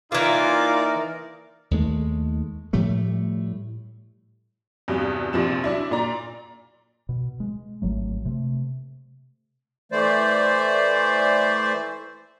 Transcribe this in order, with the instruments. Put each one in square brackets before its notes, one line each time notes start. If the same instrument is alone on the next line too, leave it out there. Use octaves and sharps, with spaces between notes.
[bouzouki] E3 A#3 [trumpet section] D#4 A#4 D5 [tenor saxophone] F4
[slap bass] D#2 G#3 A3
A2 F3 G3 A3
[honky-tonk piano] E2 G2 C3 F#3
A#1 C3 F3 E7
F#3 D4 E4
A#2 D5 A#5
[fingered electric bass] B2
G#3
G#1 F#3 A3
C3 A3
[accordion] E3 A3 C5 D5